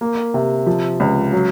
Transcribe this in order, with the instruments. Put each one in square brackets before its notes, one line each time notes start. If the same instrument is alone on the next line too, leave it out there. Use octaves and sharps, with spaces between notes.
[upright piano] A#3
C3
F3
C#2
F#3